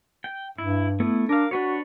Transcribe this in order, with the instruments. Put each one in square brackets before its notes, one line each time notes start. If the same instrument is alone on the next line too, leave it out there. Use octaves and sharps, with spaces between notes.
[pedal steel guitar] G5
[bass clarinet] G2 [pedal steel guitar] E4
[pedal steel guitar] A3 B3 E4
[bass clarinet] D4 [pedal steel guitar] A#4 F5
[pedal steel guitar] D4 B4 C#5 [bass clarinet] F#4